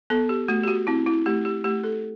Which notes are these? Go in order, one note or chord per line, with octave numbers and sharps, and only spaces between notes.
B3 A4
G4
A3 F#4
G4
F#4
C4 E4
E4
A3 G4
G4
A3 G4
A4